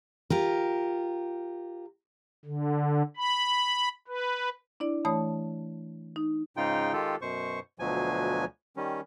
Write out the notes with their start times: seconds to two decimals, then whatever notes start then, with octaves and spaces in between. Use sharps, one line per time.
0.30 F4 G4 A#4
2.46 D3
3.17 B5
4.08 B4
4.80 D4 E4 D5
5.05 E3 A3 C#5 A5 B5 D#6
6.16 D#4
6.57 G#2 C#3 D#4 F4 G5
6.93 D#3 G#3 F4 G4 A4
7.21 F#2 B2 C5 C#6
7.79 D2 B2 F3 F#3 G#5
8.77 D#3 G3 C#4